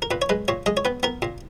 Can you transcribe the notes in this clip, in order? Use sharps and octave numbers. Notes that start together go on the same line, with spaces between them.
A#4
A#2 B4
C#5
G#3 B4
A#2 C#5
G#3 D#5
C#5
B3 B4
B3 A#4
A#2